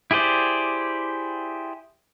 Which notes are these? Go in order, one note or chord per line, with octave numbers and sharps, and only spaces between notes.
E4 G4 G#4 C5 D5